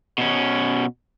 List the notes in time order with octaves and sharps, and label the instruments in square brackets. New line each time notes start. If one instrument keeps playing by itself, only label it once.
[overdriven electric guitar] B2 C#4